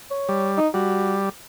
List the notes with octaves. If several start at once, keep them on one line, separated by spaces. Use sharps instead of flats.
C#5
G3
D#4
G3 F#4